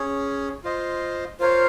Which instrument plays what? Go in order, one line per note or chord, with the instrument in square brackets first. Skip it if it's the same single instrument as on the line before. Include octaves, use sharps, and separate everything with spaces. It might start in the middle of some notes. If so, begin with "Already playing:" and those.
Already playing: [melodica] C#4 G#4 C#5
F4 C5 D#5
[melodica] F4 A#4 C#5 F5 [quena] C5